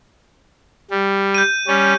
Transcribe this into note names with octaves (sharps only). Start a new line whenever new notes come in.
G3
G6 D#7
G3 C#4